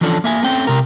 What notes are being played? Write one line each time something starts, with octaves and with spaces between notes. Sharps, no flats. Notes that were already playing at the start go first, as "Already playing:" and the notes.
E3 F3 C#4 D4 A4
A#3 E5 G#5
A3 C4 C#4 G5
C3 A#4